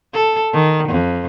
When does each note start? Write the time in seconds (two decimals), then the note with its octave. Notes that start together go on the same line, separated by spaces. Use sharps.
0.14 A4
0.53 D#3
0.89 F2